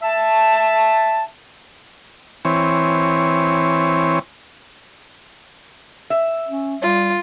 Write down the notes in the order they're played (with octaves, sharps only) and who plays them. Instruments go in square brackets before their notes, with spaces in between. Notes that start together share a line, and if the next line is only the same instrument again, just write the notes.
[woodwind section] E5 A5
[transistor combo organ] E3 C4 C#5
[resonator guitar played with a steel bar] E5
[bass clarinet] C#4
[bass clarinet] G3 [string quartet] F4